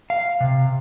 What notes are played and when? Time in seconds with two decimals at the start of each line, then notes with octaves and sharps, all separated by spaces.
0.10 F5
0.40 C3